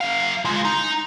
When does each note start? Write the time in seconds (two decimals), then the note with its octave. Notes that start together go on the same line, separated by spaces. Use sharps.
0.01 F#3 F5
0.45 G#3 F4
0.65 D#4